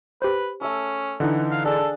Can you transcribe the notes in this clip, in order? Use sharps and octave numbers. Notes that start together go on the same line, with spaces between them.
G4 B4 C5
A3 C#4 E6
D3 E3 D#4 D#5 F#5
F5
D4 G#4 A4